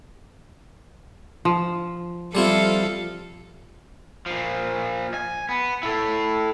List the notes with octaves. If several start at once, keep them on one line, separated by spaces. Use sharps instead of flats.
F3
F3 G3 C4 E4 F4 A4
A#2 F3
G#5
B3
E4 A4